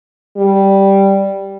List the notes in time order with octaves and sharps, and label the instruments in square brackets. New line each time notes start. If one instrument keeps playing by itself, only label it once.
[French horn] G3